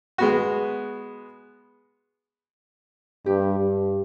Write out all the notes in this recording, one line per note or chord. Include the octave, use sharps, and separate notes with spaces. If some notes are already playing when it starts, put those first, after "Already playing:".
G#3 B3 F#4
G2 G4
G2